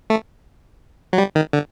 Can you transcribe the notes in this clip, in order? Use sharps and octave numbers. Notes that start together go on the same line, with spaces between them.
A3
F#3
G3
D#3
D3